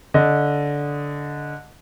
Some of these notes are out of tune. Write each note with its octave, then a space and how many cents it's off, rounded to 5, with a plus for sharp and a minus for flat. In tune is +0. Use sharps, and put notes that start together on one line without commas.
D3 -15 D#5 +0